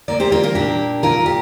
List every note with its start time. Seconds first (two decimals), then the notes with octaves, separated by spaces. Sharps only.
0.08 A#2 A#3 A#4 D5
0.20 G4 C5
0.32 F4 A#4
0.43 F4 A#4
0.55 A#2 A#3 D4 G4
1.03 A#2 A#3 F4 A#4
1.26 G4